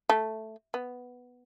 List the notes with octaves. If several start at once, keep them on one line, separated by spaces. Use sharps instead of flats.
A3
B3